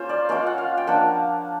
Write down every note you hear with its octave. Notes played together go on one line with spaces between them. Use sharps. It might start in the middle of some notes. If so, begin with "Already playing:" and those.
Already playing: A#3 C#4 F4 C5
D5
A#3 C#4 F4 D#5
F#5
F5
G5
F3 A#3 D4 F#5